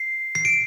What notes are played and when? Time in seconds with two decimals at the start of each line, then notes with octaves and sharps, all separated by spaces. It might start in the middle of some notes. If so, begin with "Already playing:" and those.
Already playing: C7
0.35 C7
0.45 D7